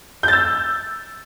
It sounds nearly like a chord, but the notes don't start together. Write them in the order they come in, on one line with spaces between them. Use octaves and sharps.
G6 A6 E6